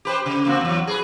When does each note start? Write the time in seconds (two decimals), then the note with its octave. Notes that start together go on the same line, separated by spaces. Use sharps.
0.05 G4 B4 C5
0.26 C#3
0.46 A#3 C4 F#4
0.61 E2 F#3
0.87 G#4 B4